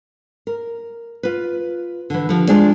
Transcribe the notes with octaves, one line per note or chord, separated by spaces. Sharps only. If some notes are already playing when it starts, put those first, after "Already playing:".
A#4
F4 B4
D3 E3
D3 F3 G4
G#3 D4 F4 G#4 C5 D5